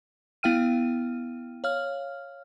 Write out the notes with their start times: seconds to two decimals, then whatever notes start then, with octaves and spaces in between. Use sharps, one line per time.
0.43 B3 E4 F5 G5 F6 D#7
1.64 C#5 F5 F6